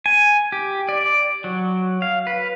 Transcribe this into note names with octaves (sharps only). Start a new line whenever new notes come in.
G#5
G4
D5
F#3
F5
B4